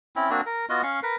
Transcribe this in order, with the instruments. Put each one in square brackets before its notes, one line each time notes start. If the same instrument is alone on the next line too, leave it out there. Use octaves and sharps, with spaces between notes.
[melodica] C4 C#4 E4
A#3 C4 D4 F#4
A#4
B3 F4 F#4 D#5
C#4 F5 C#6
A#4 B4